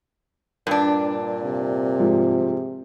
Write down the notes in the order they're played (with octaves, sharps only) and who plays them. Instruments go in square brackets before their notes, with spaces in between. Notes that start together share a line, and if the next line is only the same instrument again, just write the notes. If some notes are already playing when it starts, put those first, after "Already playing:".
[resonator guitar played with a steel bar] G2 D4 [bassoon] A#2
[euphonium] C3
[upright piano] G#2 F3